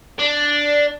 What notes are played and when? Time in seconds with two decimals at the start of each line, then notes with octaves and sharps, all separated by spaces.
0.19 D4